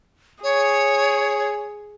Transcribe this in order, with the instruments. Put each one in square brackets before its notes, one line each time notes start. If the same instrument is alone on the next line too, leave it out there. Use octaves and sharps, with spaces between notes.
[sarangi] G#4 [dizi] C#5